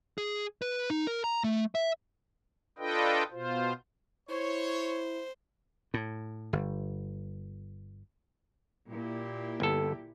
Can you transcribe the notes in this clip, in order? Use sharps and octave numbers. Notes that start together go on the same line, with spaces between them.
G#4
B4
D#4
A#4
A#5
A3
E5
D4 F4 A4 B4 D#5 G5
B2 F4 C5
E4 C5 C#5
A2
G1
A#2 E4 G4
G1 A4